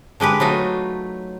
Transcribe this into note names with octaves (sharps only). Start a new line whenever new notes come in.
D3 G#3 G4 B4
F#3 A3 D#4 F4